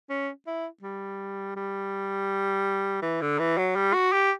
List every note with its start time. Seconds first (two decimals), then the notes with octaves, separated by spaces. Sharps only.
0.10 C#4
0.47 E4
0.83 G3
1.56 G3
3.02 E3
3.21 D3
3.39 E3
3.58 F#3
3.75 G3
3.93 F#4
4.12 G4